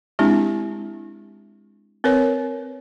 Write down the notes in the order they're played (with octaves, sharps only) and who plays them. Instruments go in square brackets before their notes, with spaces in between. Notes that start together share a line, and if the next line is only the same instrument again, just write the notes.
[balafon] G#3 C4 D4 E4 G4
C4 A#4 B4 C#5